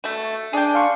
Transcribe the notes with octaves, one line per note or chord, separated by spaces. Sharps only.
A3 F#4
D4 G#4 G5
F5 C6 C#6